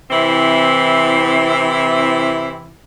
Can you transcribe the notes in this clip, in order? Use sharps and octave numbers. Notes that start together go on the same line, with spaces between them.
C3 E3 C4 E4